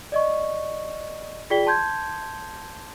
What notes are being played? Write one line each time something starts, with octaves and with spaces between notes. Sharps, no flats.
D5 D#5 C#6
F4 G#4 D5 G5 B6 G7
A5 C6 G6 G#6